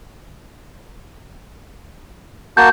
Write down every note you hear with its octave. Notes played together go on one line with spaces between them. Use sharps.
A#3 F#4 A5 G6